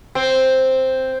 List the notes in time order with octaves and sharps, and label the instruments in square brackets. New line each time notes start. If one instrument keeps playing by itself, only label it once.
[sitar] C4